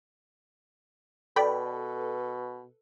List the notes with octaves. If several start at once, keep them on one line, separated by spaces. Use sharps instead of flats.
B2 A4 B4 D5 G5 B5